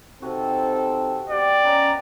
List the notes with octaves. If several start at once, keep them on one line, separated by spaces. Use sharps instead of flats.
C3 C4 D#4 F#4 A4
B3 G4 D5 F#5
C#4 B4 D#5 A#5